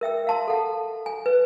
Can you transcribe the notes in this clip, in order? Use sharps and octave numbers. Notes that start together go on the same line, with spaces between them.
A#4 E5 G5 E6
F5 A5 C6
A4 F#5
G#5
B4